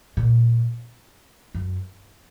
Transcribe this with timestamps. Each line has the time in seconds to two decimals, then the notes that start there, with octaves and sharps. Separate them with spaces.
0.17 A#2
1.55 F#2